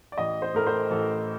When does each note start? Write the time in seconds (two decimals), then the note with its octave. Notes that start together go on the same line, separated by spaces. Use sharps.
0.12 D5
0.18 A1 D#5
0.42 C5
0.54 A2 A3 A#4
0.67 C5
0.91 A1 A4